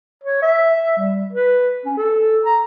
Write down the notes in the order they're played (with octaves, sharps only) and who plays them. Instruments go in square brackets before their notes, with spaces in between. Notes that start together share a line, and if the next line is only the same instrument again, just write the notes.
[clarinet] C#5
E5
G3
B4
C#4
A4
A#5